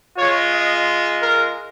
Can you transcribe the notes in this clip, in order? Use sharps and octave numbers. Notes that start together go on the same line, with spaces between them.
G#3 F4 C#5
D#5
A#4